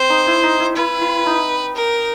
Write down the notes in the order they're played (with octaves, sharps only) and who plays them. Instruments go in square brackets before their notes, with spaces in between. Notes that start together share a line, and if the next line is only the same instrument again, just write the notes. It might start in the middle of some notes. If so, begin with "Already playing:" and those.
Already playing: [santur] C4 [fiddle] C5
[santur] D#4
E4
D#4
E4
[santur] E4 [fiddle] B4
[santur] E4
D#4
[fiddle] A#4